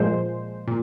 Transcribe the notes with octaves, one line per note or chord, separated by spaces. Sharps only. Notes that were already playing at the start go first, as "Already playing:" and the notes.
Already playing: A#2 F3 G#3 C5
A#2